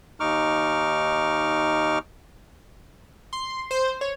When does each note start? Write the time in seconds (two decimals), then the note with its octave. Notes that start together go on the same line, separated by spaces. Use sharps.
0.20 D#2 D#4 C#6 D6 F6
3.33 C6
3.71 C5
4.01 C#5